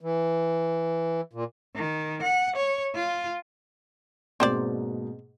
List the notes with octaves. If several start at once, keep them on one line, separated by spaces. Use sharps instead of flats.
E3
A#2
D#3
F#5
C#5
F4
G#2 B2 A#3 C4 C5 D5